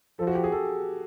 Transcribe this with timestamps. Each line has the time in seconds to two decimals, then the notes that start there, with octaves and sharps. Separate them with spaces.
0.19 F3 A4
0.27 F#4
0.35 G4
0.44 G#4
0.52 A4